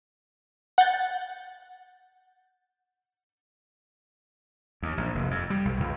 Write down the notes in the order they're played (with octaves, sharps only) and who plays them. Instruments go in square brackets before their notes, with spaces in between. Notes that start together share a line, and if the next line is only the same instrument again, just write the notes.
[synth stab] F#5 G6 A6
[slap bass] D#2
A#1
F1
F2
G3
B1
C#2